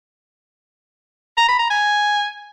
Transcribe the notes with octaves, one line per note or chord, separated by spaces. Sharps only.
A#5
B5
A#5
G#5